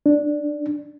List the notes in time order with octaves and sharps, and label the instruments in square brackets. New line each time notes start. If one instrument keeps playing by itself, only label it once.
[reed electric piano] D4